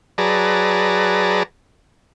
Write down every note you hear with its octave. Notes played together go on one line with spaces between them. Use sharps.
F#3 G#4 B4 D5 A5 A#5